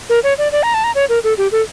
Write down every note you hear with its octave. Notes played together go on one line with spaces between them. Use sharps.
A#4
C#5
D5
D5
A#5
A5
A#5
C#5
A#4
A4
G4
A4